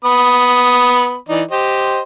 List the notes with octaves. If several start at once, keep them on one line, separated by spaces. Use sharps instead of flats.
B3 B5 D#6
E3 D#4 D5
G4 C5 D#5